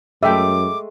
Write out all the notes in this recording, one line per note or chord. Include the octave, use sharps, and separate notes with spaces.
F#2 G#3 A3 E5 G5 D6